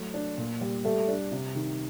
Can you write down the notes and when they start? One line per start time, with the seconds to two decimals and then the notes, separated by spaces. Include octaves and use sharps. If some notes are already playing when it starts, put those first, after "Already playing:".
Already playing: F#3 A3
0.14 D4
0.38 A#2
0.61 G3
0.85 G3 A3
1.08 D4
1.32 C3
1.55 D#3